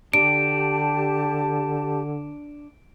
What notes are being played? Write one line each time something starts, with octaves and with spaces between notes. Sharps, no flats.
D3 D4 G4 A5 D7